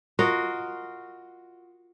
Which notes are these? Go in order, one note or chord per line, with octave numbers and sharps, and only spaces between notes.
F4 F#4 A#4 D#5